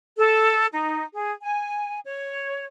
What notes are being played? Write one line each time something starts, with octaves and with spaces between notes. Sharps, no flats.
A4
D#4
G#4
G#5
C#5